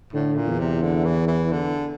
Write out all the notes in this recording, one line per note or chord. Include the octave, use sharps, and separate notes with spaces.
A2 D3
A#2
E2
C3
D3
E3
E3
D3